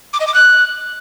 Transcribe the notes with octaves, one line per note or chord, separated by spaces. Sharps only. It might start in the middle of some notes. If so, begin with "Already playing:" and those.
D6
D#5
D6
F#6